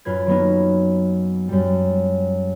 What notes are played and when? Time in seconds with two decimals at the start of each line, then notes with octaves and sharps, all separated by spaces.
0.05 F#2 F4 B4 G#6
0.27 F#3 A#3 B3 D#4
1.49 F#2 G3